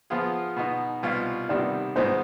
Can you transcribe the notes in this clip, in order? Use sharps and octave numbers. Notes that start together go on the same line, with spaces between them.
F3 B3 F4 G#4
B2 B3 D#4
C2 B2 B3 F4
C3 D#3 G3 B3 D5
G#2 D#3 G3 B3 D#4 C5